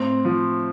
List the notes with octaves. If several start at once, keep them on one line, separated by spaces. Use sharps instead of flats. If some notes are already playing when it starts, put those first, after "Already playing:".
Already playing: A2 C4
F3